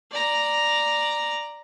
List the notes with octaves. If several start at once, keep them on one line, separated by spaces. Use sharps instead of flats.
D5 A#5